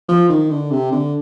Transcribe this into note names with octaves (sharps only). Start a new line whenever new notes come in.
F3
D#3
D3
C3
D3